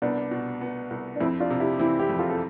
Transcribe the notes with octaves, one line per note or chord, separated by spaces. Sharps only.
C2 B3 D4
B2
B3
C2
D4
F2 C4 E4
D4 F4
C3
E4 G4
E3 C4 E4
E4 G4
F2
F4 A4
A4